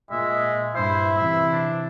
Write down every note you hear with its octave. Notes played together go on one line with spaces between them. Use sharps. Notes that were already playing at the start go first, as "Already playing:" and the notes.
A#2 G#3 E5
G2 E4 C5
C3 E3 E5
D4